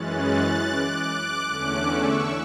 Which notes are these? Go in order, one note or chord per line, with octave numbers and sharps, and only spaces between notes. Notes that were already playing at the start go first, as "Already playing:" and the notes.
Already playing: F#2 E3 G#3 C#4 F#6 A6
D6 F#6
E2 D3 A3 C#4 D6 F#6
C#6 E6